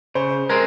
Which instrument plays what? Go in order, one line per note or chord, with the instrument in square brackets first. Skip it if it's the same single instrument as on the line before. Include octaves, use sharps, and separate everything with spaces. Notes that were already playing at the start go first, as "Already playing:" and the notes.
[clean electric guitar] C#3 [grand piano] C5
[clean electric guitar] G#3 C4 [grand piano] A#4